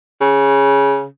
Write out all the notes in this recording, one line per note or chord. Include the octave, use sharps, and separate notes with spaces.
C#3